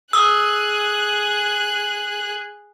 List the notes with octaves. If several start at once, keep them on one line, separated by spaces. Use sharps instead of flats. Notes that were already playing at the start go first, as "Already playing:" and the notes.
G#4 D#6 E6 F#6